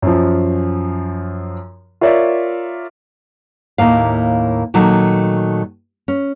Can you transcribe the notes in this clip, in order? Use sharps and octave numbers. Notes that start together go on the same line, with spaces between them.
F#2 F3
F4 A#4 C#5 D5 E5
D#2 A2 A#3 F5
A#2 D#3 F#3 A3
C#4